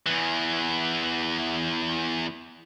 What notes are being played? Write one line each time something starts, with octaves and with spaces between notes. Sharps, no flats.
E2 E3